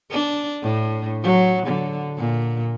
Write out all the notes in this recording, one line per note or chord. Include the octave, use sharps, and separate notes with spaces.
D4
A2
F#3
D3
A#2